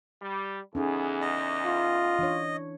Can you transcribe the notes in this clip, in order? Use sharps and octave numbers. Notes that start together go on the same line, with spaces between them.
G3
E2 C#4 D#4 G#4 A4
D#5
F4
E3 D4 C#5